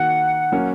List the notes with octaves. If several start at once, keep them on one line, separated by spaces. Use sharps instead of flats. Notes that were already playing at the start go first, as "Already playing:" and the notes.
Already playing: D#3 A#3 F#4 A#4 F#5
F#3 A#3 C#4